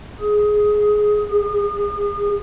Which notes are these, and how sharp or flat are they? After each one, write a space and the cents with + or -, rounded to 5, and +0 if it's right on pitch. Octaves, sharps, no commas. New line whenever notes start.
G#4 +10
G#4 -35